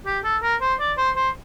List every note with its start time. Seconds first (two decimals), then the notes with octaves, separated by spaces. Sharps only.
0.06 G4
0.24 A4
0.43 A#4
0.61 C5
0.80 D5
0.98 C5
1.16 C5